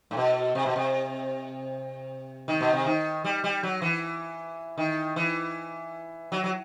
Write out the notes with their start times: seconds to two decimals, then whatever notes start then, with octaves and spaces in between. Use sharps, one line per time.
0.11 A2
0.17 B2
0.55 C3
0.66 B2
0.76 C3
2.48 D#3
2.61 B2
2.73 C3
2.86 D#3
3.24 G3
3.44 G3
3.63 F#3
3.82 E3
4.78 D#3
5.16 E3
6.32 F#3
6.44 F#3